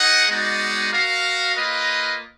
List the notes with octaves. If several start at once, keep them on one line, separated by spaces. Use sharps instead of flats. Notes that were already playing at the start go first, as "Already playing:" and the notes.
Already playing: D#4 G#4 D#5 F#5
G#3 B3 D#4 F#4 D5
F#4 A#4 F5
A#3 F4 B4 D#5